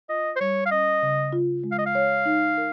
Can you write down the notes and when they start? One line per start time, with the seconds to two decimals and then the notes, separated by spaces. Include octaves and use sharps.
0.09 F4 D#5
0.36 C5
0.40 G3 C#5
0.66 F5
0.71 C#4 D#5
1.03 C#3
1.33 F4
1.64 G#3
1.71 F5
1.78 D#5
1.86 F5
1.95 C#5
2.26 D#4
2.57 A#4